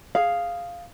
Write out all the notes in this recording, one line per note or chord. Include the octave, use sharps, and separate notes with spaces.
G#4 F5